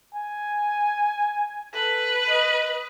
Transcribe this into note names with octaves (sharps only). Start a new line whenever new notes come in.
G#5
A4 B4
D#5